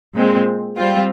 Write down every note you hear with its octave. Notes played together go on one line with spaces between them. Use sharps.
A#2 G#3 C4
G3 C4 F4